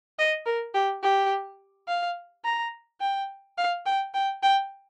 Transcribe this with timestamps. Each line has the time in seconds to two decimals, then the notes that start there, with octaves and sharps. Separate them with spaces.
0.19 D#5
0.46 A#4
0.75 G4
1.03 G4
1.88 F5
2.45 A#5
3.01 G5
3.58 F5
3.86 G5
4.14 G5
4.43 G5